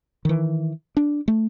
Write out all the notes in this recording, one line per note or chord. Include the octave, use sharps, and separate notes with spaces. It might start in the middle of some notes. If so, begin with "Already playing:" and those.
D#3 E3
D4
A3